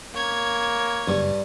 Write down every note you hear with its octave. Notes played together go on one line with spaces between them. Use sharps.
A#3 C#5 G#6
F#1 G2